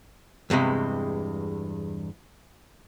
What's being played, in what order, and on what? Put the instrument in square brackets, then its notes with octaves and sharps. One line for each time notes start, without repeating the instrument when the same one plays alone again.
[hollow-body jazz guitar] E2 G2 C3 G#3